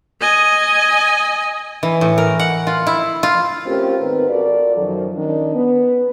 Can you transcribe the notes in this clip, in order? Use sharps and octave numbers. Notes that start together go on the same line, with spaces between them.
D#5 G#5
E3
A2
A#4
F#5
F4
E4
F4
A3 C4 C#4 F4 G4 A#4
G#2 D#3 B3 C4 A#4 B4
F4 F#4 A4 A#4 D5
F#2 D#3 F3 F#3
D#3 C#4 D4
B3